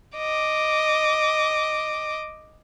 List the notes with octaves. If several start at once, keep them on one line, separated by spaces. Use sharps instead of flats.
D#5 D6